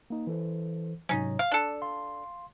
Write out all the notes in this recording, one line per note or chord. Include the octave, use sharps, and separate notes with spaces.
A#3 D#4
E3 A4 C5
G#2 C3 F#3 C#4 D#4
F5
D4 A4 D5
F5 C6